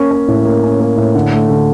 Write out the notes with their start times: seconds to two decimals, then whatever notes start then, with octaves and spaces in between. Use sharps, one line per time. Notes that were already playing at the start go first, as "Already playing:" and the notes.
Already playing: A#3 C#4
0.11 C#4
0.28 A2
0.45 A#3
0.64 C#4
0.80 A#3
0.97 A2
1.15 D3
1.32 A3
1.49 D3